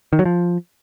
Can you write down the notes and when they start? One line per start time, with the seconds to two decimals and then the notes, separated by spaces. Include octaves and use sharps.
0.13 D#3
0.19 F#3
0.25 F3